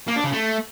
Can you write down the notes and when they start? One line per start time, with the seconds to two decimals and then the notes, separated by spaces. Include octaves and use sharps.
0.08 A#3
0.16 D4
0.24 C#3
0.32 A3